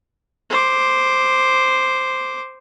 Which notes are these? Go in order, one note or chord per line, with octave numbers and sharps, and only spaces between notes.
C5 D6